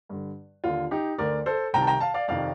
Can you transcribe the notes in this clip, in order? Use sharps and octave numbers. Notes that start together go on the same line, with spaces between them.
G2 D3
D#2 D3 F4
D#4 G4
D2 D3 A#4 D5
A4 C5
C2 C3 D#3 G5 A#5
A5
G5 A#5
F5 A5
D5 F5
F2 C3 D#3 D5 F5